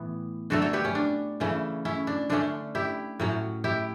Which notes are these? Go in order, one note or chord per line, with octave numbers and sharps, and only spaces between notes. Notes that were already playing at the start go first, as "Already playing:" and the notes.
Already playing: A2 E3 B3
D3 F#3 A3 F#4 A4
A4 C#5
G4 B4
C#4
D4
C#3 E3 A3 C#4
C#4 E4
D4
D3 A3 C#4 D4
E4 G4
A2 F#3 C#4
E4 G4